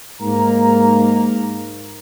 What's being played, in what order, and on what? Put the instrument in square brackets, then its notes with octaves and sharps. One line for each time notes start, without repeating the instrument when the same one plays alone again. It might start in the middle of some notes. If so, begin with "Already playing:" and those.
[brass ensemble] G#2 A#3 A#5